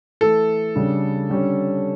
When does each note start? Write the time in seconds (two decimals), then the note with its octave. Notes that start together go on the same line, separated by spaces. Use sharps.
0.21 E3 A3 E4 A4
0.75 C#3 G3 D4
1.29 D3 G3 C#4